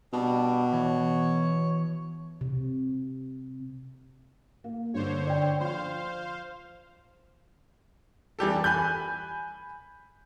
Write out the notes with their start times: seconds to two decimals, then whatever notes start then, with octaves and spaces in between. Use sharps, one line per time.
0.13 B2 G3 D4
0.72 E3 C#5
2.41 C3
4.64 A#3
4.94 G2 D3 C5 C#5
5.26 D5 G5
5.60 F3 C5 F5 C6
8.39 E3 G3 G4 A4
8.64 G#5 B5 F#6 G6